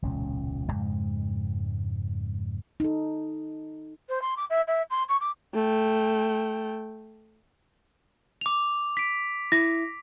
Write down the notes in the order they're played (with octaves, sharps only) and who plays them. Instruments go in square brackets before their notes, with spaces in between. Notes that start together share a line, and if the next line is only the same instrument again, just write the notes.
[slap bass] E1 C#2 A#2 C#4
F2 G#2 C#3 G#3
[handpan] D#4 A4
[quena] C5
C6
D6
E5
E5
C6
C#6
D6
[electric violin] A3 G5
[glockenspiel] D6 F7
B6 D7
[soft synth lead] E4 [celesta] A#6